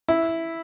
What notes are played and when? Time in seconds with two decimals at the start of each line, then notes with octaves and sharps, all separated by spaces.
0.08 E4